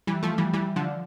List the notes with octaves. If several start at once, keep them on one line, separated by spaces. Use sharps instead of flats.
E3 G3
F3 A3
E3 G3
E3 G3
D3 F3